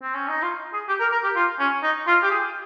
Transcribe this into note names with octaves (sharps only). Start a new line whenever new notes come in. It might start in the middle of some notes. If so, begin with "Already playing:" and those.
C4
C#4
D#4
F4
G#4
G4
A#4
A#4
G4
F4
C#4
D#4
F4
G4
G#4